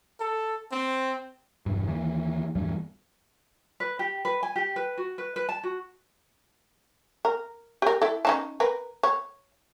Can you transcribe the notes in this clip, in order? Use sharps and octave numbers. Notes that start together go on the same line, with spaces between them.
A4
C4
E1 G2
D#2 E3
A1 E2 G2 G3
B4
G4
B4
G#5
G4
B4
F#4
B4
B4
A5
F#4
A#4
G4 A#4
E4 A4
C#4 D#4 A5
A#4 B4
C#5